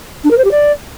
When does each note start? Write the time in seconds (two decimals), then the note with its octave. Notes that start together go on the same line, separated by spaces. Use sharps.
0.24 D4
0.30 A#4
0.37 C5
0.44 G4
0.51 D5